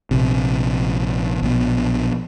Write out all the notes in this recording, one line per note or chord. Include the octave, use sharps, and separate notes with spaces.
A#1 C3
A#1 B2